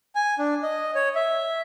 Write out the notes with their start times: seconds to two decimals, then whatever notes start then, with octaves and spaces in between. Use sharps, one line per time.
0.15 G#5
0.39 D4
0.63 D#5
0.95 C#5
1.15 E5